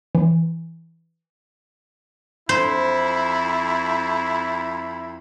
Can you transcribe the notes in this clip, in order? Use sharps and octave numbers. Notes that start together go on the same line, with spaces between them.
E3
F2 E4 C5